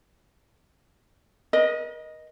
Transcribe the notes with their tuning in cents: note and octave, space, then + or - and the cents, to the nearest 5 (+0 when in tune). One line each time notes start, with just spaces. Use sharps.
A#4 +45 D#5 +0